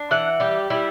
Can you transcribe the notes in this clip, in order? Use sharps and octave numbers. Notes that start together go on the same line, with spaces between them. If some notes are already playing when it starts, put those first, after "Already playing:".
Already playing: D4
E3 F#5
G3 G4
G3 E4